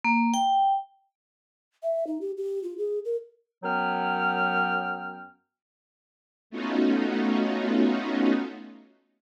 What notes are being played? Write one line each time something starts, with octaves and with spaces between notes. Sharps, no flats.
A#3
G5
E5
D#4
G4
G4
F4
G#4
A#4
F#2 F#3 B3 G5 F6
A3 B3 C#4 D#4 F4 F#4